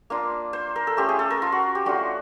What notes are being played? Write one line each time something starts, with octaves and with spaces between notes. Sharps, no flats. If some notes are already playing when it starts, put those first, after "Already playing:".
A#3 D4 F4
C5
A#4
A4
A3 C#4 F4 G4
G#4
A4
A#4
F4
F#4
G4
A3 D4 F4 F#4